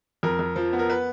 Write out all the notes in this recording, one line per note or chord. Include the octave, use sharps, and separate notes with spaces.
F2 A#4
F2
F3
B3
A#4
B4